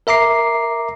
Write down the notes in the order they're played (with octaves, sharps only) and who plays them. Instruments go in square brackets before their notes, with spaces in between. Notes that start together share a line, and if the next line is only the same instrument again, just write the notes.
[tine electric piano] A#4 E5 A#5 D6 C7